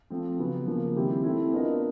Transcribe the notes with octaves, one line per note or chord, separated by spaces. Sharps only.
F3 A3 C4
C#3 F#3 B3
C#3 F3 A#3
D#3 G3 C4 E4 G4
A3 C4 E4
B3 D4 F4 A#4 D#5